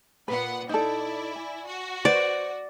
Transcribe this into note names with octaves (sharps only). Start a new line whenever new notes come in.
A#2 B3 B4 F#5
D#4 E4 A4 D5
G#5
F#4
B4 C5 D5